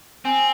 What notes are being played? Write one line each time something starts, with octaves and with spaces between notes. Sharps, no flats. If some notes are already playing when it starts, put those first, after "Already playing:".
C4 G#5